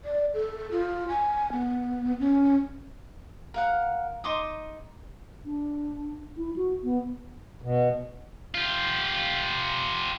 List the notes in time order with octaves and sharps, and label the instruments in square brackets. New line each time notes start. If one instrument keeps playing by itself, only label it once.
[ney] D5
A4
F4
G#5
B3
C#4
[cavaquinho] A#4 F5 F#5
D#4 C6 D6 D#6
[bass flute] D4
E4
F#4
B3
[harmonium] B2
[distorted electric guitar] F4 G4